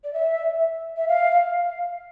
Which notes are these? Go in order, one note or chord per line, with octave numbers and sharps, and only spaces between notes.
D5
E5
E5
F5